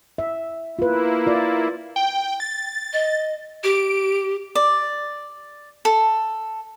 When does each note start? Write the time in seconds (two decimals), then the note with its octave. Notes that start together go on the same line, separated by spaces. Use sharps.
0.18 E5
0.79 A#3 E4 F4 B4
1.27 F4 D5
1.96 G5
2.40 A6
2.93 D#5
3.64 G4 D7
4.55 D5
5.85 A4